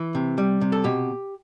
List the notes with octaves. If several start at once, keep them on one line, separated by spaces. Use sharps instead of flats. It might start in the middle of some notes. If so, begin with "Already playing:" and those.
Already playing: E3
C3
G3
C3
A4
B2 G4